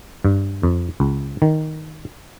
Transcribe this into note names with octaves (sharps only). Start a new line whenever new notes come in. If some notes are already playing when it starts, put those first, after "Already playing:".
G2
F2
C#2
D#3